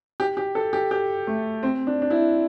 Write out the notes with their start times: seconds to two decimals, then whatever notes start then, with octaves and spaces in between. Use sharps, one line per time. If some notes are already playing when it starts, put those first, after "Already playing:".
0.20 G4
0.37 G4
0.55 A4
0.73 G4
0.91 G4
1.27 A3
1.63 C4
1.87 D4
2.02 D4
2.10 E4